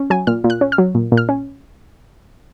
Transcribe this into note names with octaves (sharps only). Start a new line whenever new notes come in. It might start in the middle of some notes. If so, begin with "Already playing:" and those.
Already playing: C#4
F#3 G#5
A#2 F6
A#2
F#6
C#4
F6
F#3
A#2
A#2
F6
C#4